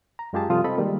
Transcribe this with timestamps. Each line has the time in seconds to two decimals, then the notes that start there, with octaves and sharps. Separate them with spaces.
0.19 A#5
0.33 F#2 G#3 F4 G4 G#4 A5
0.50 C3 F3 G3 F4 A4 D#6
0.64 C4 A4 D#5 B5
0.78 D#3 G3 G#3 A#3